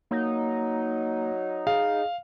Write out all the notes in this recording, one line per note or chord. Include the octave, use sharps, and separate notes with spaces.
F#3 A#3 D#4
G#4 F5